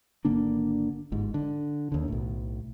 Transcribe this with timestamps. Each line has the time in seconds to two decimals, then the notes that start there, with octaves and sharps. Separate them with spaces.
0.25 G#1 D3 A#3 D4
1.12 G1 G#2
1.34 D3
1.92 D#2 D3
2.08 B1 A2